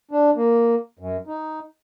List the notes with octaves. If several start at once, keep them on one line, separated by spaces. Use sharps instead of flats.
D4
A#3
F#2
D#4